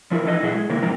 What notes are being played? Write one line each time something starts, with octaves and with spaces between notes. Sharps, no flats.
F3 E4 A#4
E3 D#4 E4 A4 B4 D#5
A#2 F#3 E4 G#4 E5 F#5
G#3
C3 D#3 A#3 E4 A#4
G#2 F3 C4 D#4 A#4 A#5